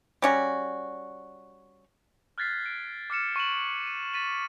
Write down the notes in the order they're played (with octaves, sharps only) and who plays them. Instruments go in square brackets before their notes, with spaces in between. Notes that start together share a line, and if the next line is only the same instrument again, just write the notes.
[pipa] G3 C#4 F#4
[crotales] F6 F#6 G#6 A6 B6 C7
D7
D6 F6 C#7 E7
C#6 D#7 E7 F#7
D#7
A6 B6 D#7 F#7